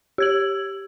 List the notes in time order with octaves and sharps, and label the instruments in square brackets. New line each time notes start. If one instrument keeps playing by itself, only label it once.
[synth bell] G4 G#6 F#7